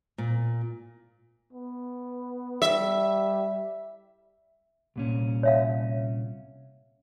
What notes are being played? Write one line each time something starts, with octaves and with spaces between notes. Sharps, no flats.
A#2
B3
G3 E5
C2 A#2 C#4
C#5 E5 F5